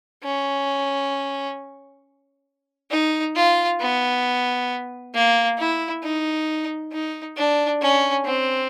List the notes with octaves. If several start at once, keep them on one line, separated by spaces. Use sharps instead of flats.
C#4
D#4
F4
B3
A#3
E4
D#4
D#4
D4
C#4
C4